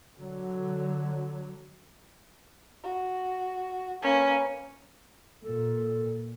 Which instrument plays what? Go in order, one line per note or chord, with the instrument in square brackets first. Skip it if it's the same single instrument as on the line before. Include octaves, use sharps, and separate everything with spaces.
[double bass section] D3 F#3
[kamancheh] F#4
[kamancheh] A#3 B4 [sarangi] C#4
[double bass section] A#2 [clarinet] A4